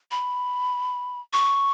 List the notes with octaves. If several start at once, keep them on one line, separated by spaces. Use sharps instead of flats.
B5
C#6